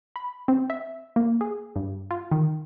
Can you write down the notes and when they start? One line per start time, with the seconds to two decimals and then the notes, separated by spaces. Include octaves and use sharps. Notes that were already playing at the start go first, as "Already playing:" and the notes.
0.16 B5
0.48 C4
0.70 E5
1.16 A#3
1.41 G#4
1.76 G2
2.11 F4
2.32 D#3